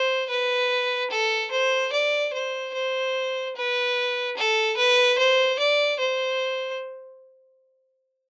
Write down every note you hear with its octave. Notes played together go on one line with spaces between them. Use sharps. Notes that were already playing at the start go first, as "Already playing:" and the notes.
Already playing: C5
B4
A4
C5
D5
C5
C5
B4
A4
B4
C5
D5
C5